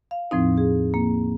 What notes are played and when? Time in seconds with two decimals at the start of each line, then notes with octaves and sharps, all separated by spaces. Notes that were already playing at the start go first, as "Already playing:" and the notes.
0.11 F5
0.31 E2 A2 F3 C4 D#4
0.58 G#4
0.94 A#3